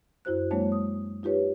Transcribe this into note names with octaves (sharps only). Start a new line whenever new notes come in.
F#2 E4 F#4 C5 F#6
F#3 G#3 A#3 D4 C#5 A5
D#6
D#4 F4 G4 B4 C#5